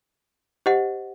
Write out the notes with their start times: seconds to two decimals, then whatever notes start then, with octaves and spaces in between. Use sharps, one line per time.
0.66 G4 C5 D#5 F#5